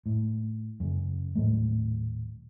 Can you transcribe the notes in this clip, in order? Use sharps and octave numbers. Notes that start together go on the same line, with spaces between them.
A2
F#2 C#3
D#1 A2 F#3 A3